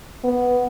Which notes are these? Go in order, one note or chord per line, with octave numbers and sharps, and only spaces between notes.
B3